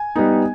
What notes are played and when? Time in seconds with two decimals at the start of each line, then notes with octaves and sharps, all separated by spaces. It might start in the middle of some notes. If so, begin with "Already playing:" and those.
Already playing: G#5
0.16 G3 B3 D#4